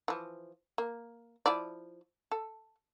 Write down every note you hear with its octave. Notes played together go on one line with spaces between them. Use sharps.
E3 F3
A#3
F3 E4 D5
A4